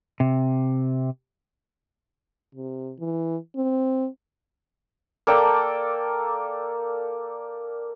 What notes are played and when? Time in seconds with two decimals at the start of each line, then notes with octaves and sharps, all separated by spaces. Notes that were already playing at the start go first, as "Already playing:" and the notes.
0.20 C3
2.55 C3
2.99 E3
3.56 C4
5.27 A#3 A4 D5 G5